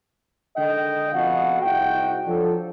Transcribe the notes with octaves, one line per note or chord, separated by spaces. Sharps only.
D3 D#3 G#3 D#5 G5
F2 B2 F#4 F5 F#5
C2 G#2 F#4 G5
F3 F#3 D4 A4